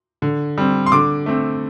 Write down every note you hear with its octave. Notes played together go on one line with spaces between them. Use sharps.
D3
G3 C4
C6
D3 D6
A3 C4